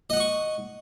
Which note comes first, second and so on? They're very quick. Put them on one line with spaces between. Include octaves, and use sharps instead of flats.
D#5 F#5 D#6 C#6